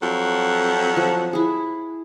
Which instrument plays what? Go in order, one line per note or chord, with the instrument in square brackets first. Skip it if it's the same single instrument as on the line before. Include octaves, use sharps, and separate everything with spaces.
[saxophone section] F2 F#3 F#5
[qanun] F3
E4 G#4